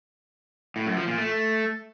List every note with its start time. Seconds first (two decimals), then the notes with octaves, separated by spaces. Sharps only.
0.76 A2
0.86 F#2
0.97 F3
1.07 A#2
1.18 A3